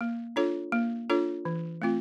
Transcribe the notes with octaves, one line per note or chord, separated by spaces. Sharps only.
A#3
D4 F4 A4 C#5
A#3
D4 F4 A4 C#5
E3
A3 C4 F4